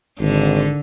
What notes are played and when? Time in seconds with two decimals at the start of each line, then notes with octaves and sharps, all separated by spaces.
0.19 G#1 D3